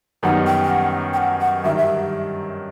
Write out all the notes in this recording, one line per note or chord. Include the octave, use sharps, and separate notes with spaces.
F#2 D#3 G3 B3 D#4 F#5
G5
G5
F#5
G5
F#5
F#5
G2 D#3 F#3 E5
E5